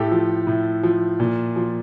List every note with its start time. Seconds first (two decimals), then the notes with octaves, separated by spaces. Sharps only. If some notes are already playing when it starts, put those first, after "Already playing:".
Already playing: A2 G4 A4
0.11 F3
0.47 A2
0.83 F3
1.20 A#2
1.56 F3